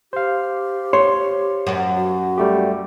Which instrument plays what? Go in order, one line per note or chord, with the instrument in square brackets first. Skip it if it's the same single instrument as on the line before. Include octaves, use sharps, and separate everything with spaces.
[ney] G4 [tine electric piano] C5 F5
[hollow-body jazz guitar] C#5 C6
[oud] F#2
[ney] F#4
[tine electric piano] G3 A3 G4